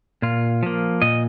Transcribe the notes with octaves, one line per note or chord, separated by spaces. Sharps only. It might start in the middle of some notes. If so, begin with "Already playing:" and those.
A#2 F4
F3 A#3
A#2 D#5